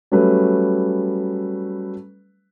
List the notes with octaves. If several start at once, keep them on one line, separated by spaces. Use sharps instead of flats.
F#3 G3 A3 C#4 B4